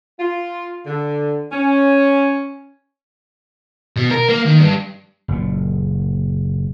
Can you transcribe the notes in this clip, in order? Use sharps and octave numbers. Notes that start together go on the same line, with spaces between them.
F4
D3
C#4
B2
A#4
A#3
D#3
G2
F#1 A#2